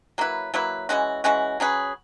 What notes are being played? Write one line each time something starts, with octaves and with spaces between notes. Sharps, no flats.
F#3 A#3 E4 B4
F#3 A#3 E4 B4
E3 G#3 C#4 F#4
E3 G#3 C#4 F#4
F#3 C#4 G#4 B4